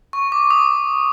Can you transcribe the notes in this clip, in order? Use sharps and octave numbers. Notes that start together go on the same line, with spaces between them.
C#6
D6
D#6